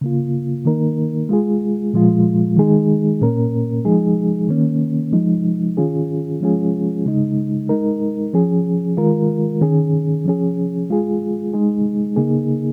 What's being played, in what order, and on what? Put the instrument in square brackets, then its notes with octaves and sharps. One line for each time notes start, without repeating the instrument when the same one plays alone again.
[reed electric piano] C#3 A#3 F4
D#3 A#3 D#4 A#4
G#3 F4 G#4
A#2 F3 G#3 F4
D#3 G#3 D#4 G#4
A#2 A#3 C#4 A#4
F3 G#3 D#4 G#4
D#3 A#3 C#4
F3 G#3 D#4
D#3 C#4 F4 G#4
F3 G#3 C#4 F4 G#4
C#3 G#3 D#4
G#3 D#4 A#4
F3 C#4 G#4
D#3 G#3 F4 A#4
D#3 C#4 G#4
F3 C#4 G#4
G#3 F4 G#4
G#3 D#4 G#4
C#3 A#3 D#4 G#4